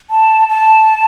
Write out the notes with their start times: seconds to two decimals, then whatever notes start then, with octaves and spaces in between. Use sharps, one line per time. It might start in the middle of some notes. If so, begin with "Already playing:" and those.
0.10 A5
0.49 A5